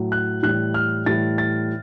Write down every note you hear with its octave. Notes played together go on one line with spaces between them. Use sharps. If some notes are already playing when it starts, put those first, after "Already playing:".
Already playing: A2 F#3
F#6
A2 E3 G3 F#6
F6
A2 E3 G3 A6
A6